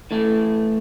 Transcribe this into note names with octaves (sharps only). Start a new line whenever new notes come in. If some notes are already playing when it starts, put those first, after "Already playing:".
A2 E3 A3